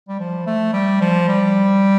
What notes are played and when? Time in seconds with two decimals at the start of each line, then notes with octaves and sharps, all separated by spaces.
0.08 G3
0.20 F3
0.46 A3
0.73 G3
1.01 F3
1.28 G3